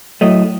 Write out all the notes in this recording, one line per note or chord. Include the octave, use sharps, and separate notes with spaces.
A2 F#3 A3 D#5